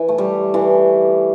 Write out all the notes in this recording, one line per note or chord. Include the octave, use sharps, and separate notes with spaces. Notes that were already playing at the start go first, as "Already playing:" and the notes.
Already playing: E3
A3
G3
E3